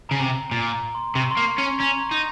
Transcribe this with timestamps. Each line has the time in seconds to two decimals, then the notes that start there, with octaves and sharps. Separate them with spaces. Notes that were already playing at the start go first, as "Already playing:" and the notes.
0.09 C#3 A#5
0.20 C3
0.51 A#2 A#5
0.73 A#5
0.95 C6
1.15 C3 C#6
1.31 C6
1.37 A#3
1.47 C6
1.58 C#4
1.64 C#6
1.79 C#4 A#5
2.01 A#5
2.11 D#4